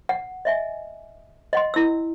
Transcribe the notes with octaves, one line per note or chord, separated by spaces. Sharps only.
F#5
D#5 E5 G#5
D#5 F#5 C6
E4 E6